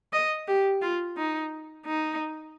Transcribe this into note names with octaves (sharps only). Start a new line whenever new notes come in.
D#5
G4
F4
D#4
D#4